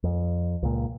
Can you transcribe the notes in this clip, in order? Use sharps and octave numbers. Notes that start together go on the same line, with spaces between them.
F2
C#2 A#2